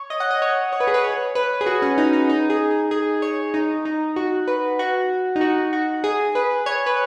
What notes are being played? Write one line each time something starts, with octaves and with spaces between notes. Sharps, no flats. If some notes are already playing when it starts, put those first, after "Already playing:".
Already playing: C#5
D#5
F#5
D#5
C#5
C#5
B4
G#4
B4
C#5
B4
G#4
F#4
C#4
D#4
D#4
D#4
G#4
G#4
G#4
C#5
D#4
D#4
F#4
B4
F#4
D#4
F#4
F#4
G#4
B4
C#5
B4